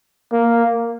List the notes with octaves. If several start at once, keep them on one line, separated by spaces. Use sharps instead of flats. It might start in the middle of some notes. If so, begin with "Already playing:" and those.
A#3